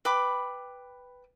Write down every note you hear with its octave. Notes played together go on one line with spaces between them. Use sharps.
B4 G5 B5 D6